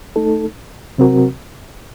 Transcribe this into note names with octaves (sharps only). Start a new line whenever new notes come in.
A3 D#4 A4
C3 F#3 C4 F#4 A#4